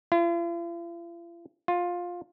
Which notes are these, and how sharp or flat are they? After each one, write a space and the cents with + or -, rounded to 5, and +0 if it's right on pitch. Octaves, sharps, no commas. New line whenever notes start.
F4 -45
F4 +15